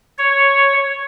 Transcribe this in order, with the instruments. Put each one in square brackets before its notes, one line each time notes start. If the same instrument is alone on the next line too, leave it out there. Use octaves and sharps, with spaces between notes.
[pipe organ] C#5